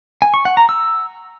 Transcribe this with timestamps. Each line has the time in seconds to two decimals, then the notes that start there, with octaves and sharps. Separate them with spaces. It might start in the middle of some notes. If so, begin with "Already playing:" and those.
0.22 G#5
0.34 C#6
0.45 F#5
0.57 A#5
0.69 E6